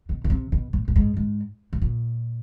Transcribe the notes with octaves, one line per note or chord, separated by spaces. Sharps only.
B2
B2
C3
B2
A2
A2
G#2
G#2
A2
A#2